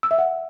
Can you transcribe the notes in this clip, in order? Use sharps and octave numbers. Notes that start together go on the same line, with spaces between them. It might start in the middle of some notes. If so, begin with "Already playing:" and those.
E6
E5
F#5